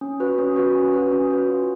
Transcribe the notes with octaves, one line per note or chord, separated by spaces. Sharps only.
C#4
F#4 B4
C#4
F#4 B4
C#4
F#4 B4
C#4
F#4 B4
F4